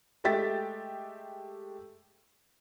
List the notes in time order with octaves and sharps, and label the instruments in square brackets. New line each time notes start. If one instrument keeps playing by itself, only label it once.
[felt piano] G#3 A3 G4 E5 A6 B6